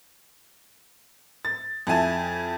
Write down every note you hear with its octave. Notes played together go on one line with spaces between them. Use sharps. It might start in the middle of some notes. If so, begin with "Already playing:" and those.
A6
F2 E4 G#5 A5